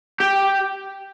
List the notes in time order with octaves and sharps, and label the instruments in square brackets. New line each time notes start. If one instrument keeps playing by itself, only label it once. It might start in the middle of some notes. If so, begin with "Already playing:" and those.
[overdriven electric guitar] G4